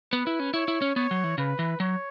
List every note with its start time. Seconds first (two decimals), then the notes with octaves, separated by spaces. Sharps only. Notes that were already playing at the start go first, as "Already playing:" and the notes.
0.12 B3 B4
0.27 E4
0.40 C#4
0.54 E4 C#5
0.68 E4
0.82 C#4
0.96 B3 C#5
1.11 F#3
1.24 E3
1.38 C#3 B4
1.59 E3
1.80 F#3 C#5